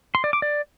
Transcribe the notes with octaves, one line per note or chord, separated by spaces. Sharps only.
C6
D5
D6
D5